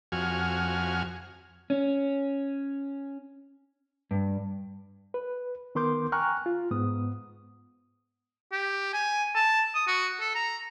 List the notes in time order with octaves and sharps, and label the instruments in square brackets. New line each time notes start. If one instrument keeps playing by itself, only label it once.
[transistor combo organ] F2 F#4 G#5 F6
[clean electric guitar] C#4
G2
[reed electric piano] B4
D#3 B3 A#4 C6 D6 G6
G5 G#5 A#5 C#6 F6 F#6
F4
G#2 B3 D#6
[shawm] G4
G#5
A5
D#6
F#4
A4
A#5